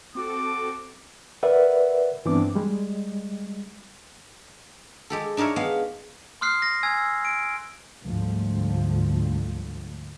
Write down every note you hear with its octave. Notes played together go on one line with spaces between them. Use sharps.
C4 F#4 A4 D6
A#4 B4 D5 E5 F#5
G2 E3 B3 C4 D4 D6
G3 G#3
G#3 G4 A4
D4 D#4 A#4 C#5 E5
G#3 B3 F5
C6 D#6 F6 F#6 C7
A#6
G#5 E6 G#6
D7
D2 G#2 F3 G3